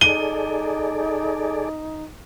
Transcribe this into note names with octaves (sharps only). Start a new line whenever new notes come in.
D#4 G#4 A4 D5 D#7 G7